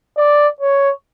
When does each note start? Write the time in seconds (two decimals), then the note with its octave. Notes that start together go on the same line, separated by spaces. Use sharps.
0.17 D5
0.61 C#5